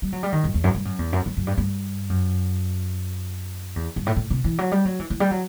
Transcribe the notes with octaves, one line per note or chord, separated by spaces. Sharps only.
G3
F#3
G3
D#3
F#2
E2
F#2
G2
F#2
E2
F#2
F#2
F#2
G2
G2
F#2
E2
G2
A2
A2
C3
E3
F#3
G3
F#3
E3
E3
G3
F#3